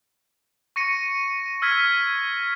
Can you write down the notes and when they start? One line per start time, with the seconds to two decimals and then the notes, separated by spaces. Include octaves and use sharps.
0.76 C#6 A#6 C#7 D#7
1.62 E6 F6 G#6 B6